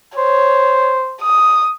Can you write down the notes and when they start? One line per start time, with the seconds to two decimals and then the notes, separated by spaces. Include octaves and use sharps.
0.18 C5 C#5
1.22 D#6